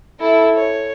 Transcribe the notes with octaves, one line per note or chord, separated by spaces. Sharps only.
E4 A4
C#5